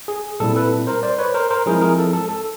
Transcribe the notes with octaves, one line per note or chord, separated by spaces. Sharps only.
G#4
A#2 G3 C4 E4 A4
A4 B4
A#4 C5
C5 D5
B4 C#5
A#4 C5
A#4 C5
F3 G#3 C4 E4 G#4 A#4
G#4 A#4
A4
A4
A4